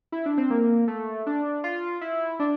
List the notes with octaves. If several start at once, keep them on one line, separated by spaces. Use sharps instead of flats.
E4
D4
C4
A#3
A3
D4
F4
E4
D4